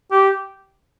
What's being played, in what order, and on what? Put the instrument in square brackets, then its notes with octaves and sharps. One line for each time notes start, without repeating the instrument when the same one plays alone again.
[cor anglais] G4